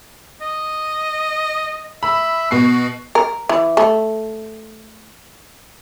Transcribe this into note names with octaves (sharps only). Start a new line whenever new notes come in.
D#5
E5 B5
B2 F#4 C7
A#4
E3
A3